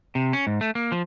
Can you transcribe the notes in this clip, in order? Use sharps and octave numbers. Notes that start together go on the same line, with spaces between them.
C3
C#4
G#2
A3
A#3
F3